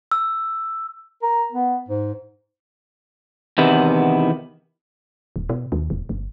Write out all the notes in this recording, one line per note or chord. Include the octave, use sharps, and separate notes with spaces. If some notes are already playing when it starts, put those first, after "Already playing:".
E6
A#4
B3
G#2
E2 C3 D#3 B3 E4
D#1
B2
D#2
E1
G1